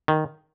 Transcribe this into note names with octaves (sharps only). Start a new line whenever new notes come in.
D#3